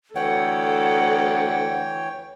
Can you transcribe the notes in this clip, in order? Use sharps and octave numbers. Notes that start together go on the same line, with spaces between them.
D2 E3 A4 C#5 F#5 G5